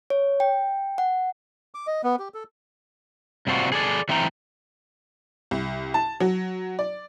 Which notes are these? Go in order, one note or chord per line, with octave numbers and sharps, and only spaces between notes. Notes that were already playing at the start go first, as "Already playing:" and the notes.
C#5
G5
F#5
D6
D#5
B3
G4
A4
G2 C3 C4 D4 F4 F#4
G#4 A4 D5
E3 A3 C4 E4 G5 A#5
C2
A5
F#3
D5